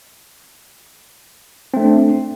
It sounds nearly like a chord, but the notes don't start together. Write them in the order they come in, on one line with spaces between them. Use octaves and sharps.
C4 A3 D4